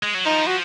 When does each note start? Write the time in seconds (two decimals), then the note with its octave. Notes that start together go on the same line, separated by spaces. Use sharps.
0.03 G#3
0.14 F#3
0.25 F3 D#4
0.47 F#4